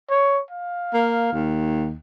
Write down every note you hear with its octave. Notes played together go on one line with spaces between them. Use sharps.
C#5
F5
A#3
D#2